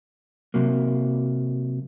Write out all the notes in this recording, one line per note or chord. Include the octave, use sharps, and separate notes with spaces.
C3 F#3 A#3